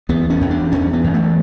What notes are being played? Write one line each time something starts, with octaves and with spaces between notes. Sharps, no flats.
E2 B3
C#4
E2
D4
E2 C#4
B3
E2
A3